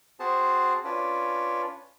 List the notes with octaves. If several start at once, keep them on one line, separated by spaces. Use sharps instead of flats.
C4 F#4 G#4 C5 A5
C#4 D4 F4 B4